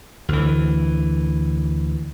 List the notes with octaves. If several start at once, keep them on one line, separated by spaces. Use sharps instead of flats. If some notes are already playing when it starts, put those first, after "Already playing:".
D2 E3